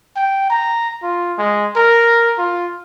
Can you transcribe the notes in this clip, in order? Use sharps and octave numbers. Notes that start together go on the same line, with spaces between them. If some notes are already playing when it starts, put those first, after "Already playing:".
G5
A#5
F4
G#3
A#4
F4